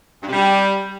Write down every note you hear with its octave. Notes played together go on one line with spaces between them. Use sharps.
G2
C3
G3